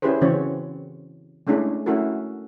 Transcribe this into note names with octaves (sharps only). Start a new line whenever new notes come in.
C#4 E4 G4 G#4 B4 C5
C#3 E3 C4 C#4 F#4 C#5
G#3 A3 C#4 D4 E4 G#4
A3 C#4 E4 F#4 A4 A#4